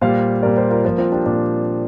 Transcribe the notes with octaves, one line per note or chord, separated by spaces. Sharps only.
A#2 G3 C5 F5
A#2 G3 A#4 D5
G4 C5
F4 A#4
A#2 F3 F4 A#4
C4 F4
D4 G4
A#2 D4